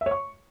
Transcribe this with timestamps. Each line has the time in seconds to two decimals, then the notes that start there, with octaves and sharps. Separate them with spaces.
0.01 E5
0.06 C#5
0.11 C#6